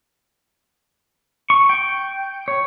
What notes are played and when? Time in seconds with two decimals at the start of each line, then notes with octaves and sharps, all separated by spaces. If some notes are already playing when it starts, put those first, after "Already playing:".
1.50 C#6
1.69 G5
2.48 C#5